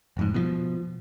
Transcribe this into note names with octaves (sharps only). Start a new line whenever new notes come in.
E1 F2 G#2
B2 D#3 F3